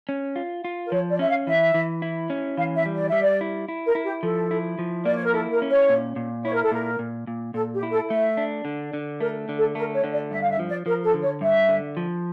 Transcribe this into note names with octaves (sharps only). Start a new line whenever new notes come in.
C#4
F4
F4
A#4
F3 C#5
D5
C#4 E5
F5
E3 E5
E3
E4
C#4
E3 F5
E5
G3
D5
G3 E5
D5
E4
E4
A#4
E4
G4
F3 A4
E4
F3
A#3 D5
C#5
A#4
E4 A4
A#4
C#4
C#5
A#2
A#2
E4 C#5
A#4
A4
A#2 A#4
A#2
A#2
A#2 A4
G4
E4
A4
A3 E5
D4
D3
D3
A3 A#4
D3
A4
A3 A#4
C#5
D3
D5
G2 E5
F5
E5
F3
D5
F3 A#4
A4
D3
C#5
G2 E5
D3
F3